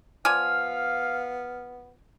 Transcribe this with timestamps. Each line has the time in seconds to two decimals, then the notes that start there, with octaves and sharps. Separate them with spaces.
0.25 F3 B3 D5 F5 G#5 F6